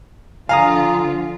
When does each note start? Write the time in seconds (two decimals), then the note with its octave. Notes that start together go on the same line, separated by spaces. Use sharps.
0.49 D3 F3 F4 F5 G#5 A#5 D#6